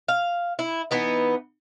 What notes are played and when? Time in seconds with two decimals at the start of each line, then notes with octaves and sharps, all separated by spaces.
0.08 F5
0.59 E4
0.91 E3 B3 D#4